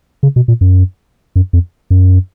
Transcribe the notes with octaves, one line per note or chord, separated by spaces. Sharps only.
C#3
B2
A#2
F#2
F#2
F2
F#2